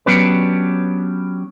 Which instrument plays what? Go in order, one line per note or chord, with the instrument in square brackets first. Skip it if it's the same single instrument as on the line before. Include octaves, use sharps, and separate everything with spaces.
[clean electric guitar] F#3 B3 C#4 D4 G4 B4